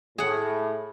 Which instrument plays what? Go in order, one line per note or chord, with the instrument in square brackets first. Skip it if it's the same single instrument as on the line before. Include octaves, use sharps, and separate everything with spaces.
[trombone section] A2 [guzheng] G#4 F#5